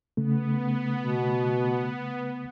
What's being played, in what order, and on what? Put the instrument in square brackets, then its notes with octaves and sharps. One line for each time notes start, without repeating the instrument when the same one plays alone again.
[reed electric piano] C#3 A3 [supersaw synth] B3
[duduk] B2